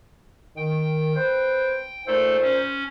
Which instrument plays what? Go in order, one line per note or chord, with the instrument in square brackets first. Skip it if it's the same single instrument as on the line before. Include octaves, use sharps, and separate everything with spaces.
[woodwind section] D#3 [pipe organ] G5
[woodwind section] C4 B4 C5
[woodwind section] A#2 D#4 C5 [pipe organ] A3 A4
[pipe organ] C#4